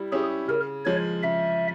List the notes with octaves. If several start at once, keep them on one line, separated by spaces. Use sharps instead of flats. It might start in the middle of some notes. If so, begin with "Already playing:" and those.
Already playing: G3 E4 G4
C#4 E4 G4 G#4
C#3 A#4
F3 G#3 C#5
C#3 E5